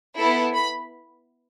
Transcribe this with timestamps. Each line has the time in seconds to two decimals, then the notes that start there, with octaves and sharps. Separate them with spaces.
0.18 B3 E4 A4
0.54 B5